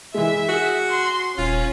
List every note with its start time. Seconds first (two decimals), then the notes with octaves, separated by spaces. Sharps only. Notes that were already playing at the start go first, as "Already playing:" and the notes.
0.14 E3 G#3 E5
0.49 F#4 G#4
0.89 C6
1.38 D#1 C#4 F4